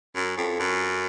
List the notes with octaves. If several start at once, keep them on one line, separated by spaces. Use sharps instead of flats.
F#2
F2
F#2